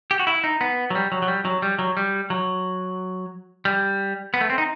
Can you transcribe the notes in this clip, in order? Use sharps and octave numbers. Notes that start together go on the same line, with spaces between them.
G4
F#4
E4
D#4
B3
F#3
G3
F#3
F#3
G3
F#3
G3
F#3
G3
F#3
G3
B3
A3
C4
D#4